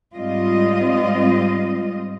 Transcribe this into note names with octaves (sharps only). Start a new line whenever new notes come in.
G#2 G3 C4 F4 D#5